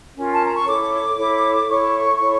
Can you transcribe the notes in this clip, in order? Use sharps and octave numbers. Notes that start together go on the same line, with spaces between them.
C#4 F4 A#4
A5
A#5
C#6
E4 A4 C#5 D6
E4 A4 C#5
E4 A4 C#5 C#6
E4 A4 C#5